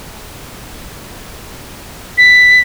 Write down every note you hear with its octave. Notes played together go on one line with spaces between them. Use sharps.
B6